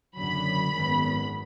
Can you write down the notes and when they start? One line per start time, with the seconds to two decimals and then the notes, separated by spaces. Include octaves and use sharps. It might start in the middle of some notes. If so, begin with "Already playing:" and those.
0.16 F#1 F#2 D3 F#3 B5
0.74 G#1 F#2 D#3 G#3 B3